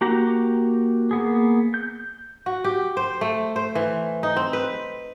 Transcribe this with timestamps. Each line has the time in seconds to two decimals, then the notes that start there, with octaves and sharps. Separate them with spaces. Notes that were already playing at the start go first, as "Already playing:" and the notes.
0.01 A#3 F#4 G4 A#5
1.11 A#3 B3 G#4
1.74 G6
2.46 F#4
2.64 G4
2.97 C5
3.21 A3
3.56 C5
3.75 E3
4.23 D#4
4.36 C4
4.53 B4